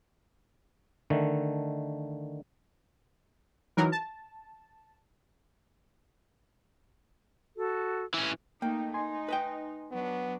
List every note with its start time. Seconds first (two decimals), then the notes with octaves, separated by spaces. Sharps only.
1.10 D3 D#3 A3
3.77 E3 F#3 D#4 A#4
3.92 A5
7.56 F#4 A4
8.14 E3 C#4
8.62 A3 A#3 D#4 G5
8.94 D#4 G#5 C6
9.28 B4 D#5 G5
9.92 F#3 B3 D4